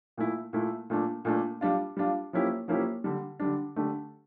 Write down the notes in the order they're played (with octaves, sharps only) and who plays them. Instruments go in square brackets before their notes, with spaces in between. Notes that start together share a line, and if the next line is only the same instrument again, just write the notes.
[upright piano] A#2 A3 E4
A#2 A3 E4
A#2 A3 D4
A#2 A3 D4
G3 D4 F4
G3 D4 F4
F3 A#3 C#4 E4 G4
F3 A#3 C#4 E4 G4
D3 G3 D4
D3 G3 D4
D3 A3 D4 G4